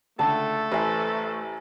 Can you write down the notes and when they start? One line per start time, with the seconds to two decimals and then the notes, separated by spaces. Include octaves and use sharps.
0.19 C#2 D3 A3 A4 A5
0.72 A1 E4 B4 C5 G#5